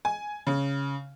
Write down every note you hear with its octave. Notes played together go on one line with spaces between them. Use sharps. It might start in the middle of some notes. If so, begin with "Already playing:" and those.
G#5
C#3